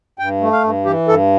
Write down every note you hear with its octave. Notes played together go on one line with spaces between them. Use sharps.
G2 G5
A3
F5
G2
E3 G4
G2 A4